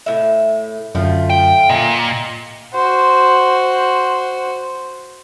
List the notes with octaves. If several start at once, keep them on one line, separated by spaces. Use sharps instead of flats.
A2 E5
F#2 D3 F3 F#3 A3
G5
A#2 D#5
F#4 C5